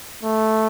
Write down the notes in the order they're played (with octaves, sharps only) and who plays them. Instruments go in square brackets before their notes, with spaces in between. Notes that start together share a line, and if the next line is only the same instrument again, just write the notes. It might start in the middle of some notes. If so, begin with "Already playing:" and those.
[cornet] A3